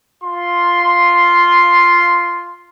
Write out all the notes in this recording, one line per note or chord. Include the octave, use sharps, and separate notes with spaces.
F4 C6